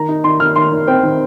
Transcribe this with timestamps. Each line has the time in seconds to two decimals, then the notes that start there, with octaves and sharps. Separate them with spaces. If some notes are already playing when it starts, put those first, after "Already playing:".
Already playing: D#3 A#5
0.09 D#4
0.24 D#3 C6
0.40 D#3 F6
0.56 D#3 C6
0.72 D#3
0.87 C4 G5
1.03 D#3